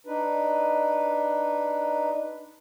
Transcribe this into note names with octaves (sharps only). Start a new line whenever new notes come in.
D4 D#4 B4